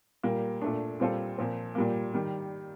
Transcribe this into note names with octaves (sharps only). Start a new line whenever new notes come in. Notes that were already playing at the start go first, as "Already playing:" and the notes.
A#2 G3 A#3
A#2 A3 D4
A#2 G3 C4 F4 A4
A#2 F3 C4
A#2 G3 A#3
D#3 G3